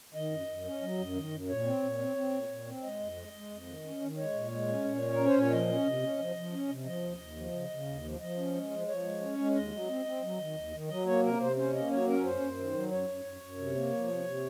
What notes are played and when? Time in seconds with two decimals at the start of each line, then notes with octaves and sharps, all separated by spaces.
0.14 D#3 D#5
0.31 F#2
0.47 F#2
0.65 C#4
0.81 F#3
0.98 F#2
1.15 D#3
1.31 F#2
1.49 A#2 C#5
1.65 C4
1.82 A#2
1.98 C4
2.16 C4
2.32 A#2
2.49 A#2
2.66 C4
2.83 G#3 D#5
3.00 F2
3.16 G#3
3.33 G#3
3.50 F2
3.67 D#3
3.83 C#4
4.01 D#3
4.17 G#3 C#5
4.34 A#2
4.52 G#3
4.68 C#4
4.84 A#2
5.02 C#4
5.12 A#4
5.18 C#4
5.26 C5
5.35 A#2 C#5
5.52 F3 D#5
5.69 C#4
5.86 C3
6.02 C#4
6.19 F3
6.36 F3
6.52 C#4
6.69 C3
6.86 F3 D#5
7.03 D#2
7.19 D#2
7.37 F3
7.53 C#3
7.70 C#3
7.87 D#2
8.03 F3
8.20 F3 D#5
8.37 C#4
8.55 G#3
8.71 F3
8.88 F3 C#5
9.04 G#3
9.21 C#4
9.39 G#3
9.55 D#2 D#5
9.72 F#3
9.89 C4
10.05 C4
10.22 F#3
10.39 D#3
10.56 D#2
10.73 D#3
10.89 F#3 D#5
11.06 A#3 C#5
11.23 C3 A#4
11.40 C3 C5
11.56 C#4 C5
11.73 A#3 D#5
11.90 F#3 C#5
12.07 C#4 A#4
12.23 F#2 C5
12.41 F#2
12.58 D#3
12.74 F#3
12.91 F#2 C#5
13.08 F#2
13.25 F#2
13.42 F#2
13.58 C3
13.75 A#3
13.92 F3
14.08 C3
14.26 C3